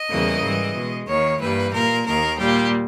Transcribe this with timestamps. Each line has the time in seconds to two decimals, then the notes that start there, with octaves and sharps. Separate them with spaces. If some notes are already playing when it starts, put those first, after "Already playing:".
Already playing: D#5
0.09 E2 C#3 E3 G3 A#3
0.42 G#2 E3 G3
0.75 B2 G#3
1.08 D#2 D#3 A#3 C#5
1.40 G2 E3 G3 A#3 B4
1.74 A#2 A#3 A#4
2.06 D#2 D#3 A#3 A#4
2.38 A#2 G3 A#3 G4